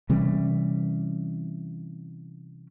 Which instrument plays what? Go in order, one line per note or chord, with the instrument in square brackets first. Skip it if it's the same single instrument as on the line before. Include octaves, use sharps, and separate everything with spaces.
[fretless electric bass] C3 E3 G3 C#4